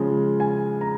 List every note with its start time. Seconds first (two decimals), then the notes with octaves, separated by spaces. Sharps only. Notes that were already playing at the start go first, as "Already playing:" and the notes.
Already playing: C#3 F3 G#3
0.40 G#5
0.81 A#5